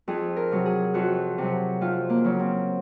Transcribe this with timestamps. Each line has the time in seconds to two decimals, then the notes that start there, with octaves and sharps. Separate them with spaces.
0.08 F2 G#4
0.36 A#4
0.51 C3 F#3
0.66 G#4
0.94 F2 F#4
1.38 C3 F#3
1.81 F2 F4
2.10 A#3
2.24 C#3 F#3
2.39 C4